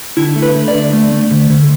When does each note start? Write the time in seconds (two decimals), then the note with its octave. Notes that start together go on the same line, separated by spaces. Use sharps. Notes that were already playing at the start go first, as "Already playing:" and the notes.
0.17 D3 E4
0.36 A3
0.42 B4
0.55 A3
0.68 D5
0.74 D3
0.93 A3
1.12 A3
1.31 D3
1.50 D3